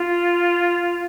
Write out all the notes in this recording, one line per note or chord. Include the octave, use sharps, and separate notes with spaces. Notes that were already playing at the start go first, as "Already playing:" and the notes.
Already playing: F4